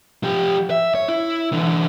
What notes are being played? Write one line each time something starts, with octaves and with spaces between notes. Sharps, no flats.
F3 G4
E5
C#5
E4
D3 E3